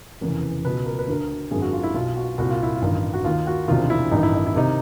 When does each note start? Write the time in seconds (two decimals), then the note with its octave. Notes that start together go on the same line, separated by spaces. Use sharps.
0.21 F1 E2 C#3 E3 A#4
0.65 C#2 B2 B4
0.86 A#4
0.99 B4
1.08 D2 D3 A#4
1.51 G#1 F#2 D3 G#4
1.62 F#4
1.73 F4
1.83 E4
1.94 B1 B2 F4
2.16 F#4
2.38 C2 A#2 F#4
2.50 F4
2.63 E4
2.75 F4
2.82 A1 G2 D#3
3.13 F#4
3.24 D#2 D#3 F4
3.47 F#4
3.68 E1 D2 C3 D#3 F4
3.90 E4
4.11 A1 G2 D#3 D#4
4.23 E4
4.35 D#4
4.46 E4
4.55 C3 D#3 D#4